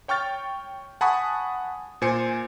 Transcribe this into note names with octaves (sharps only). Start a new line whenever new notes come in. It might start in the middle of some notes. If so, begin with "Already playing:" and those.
C#5 G5 C#6 F6 A6
F#5 G#5 A5 B5 C#6 D#6
A#2 C5 G#5 C#7